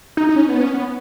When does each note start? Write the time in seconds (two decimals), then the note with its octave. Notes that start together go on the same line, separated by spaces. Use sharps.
0.17 D#4
0.29 D#4
0.36 C#4
0.49 B3
0.61 C#4
0.74 B3